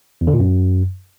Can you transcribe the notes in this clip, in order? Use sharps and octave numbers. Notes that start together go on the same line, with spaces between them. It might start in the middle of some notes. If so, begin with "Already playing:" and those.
E2
D3
A#2
F#2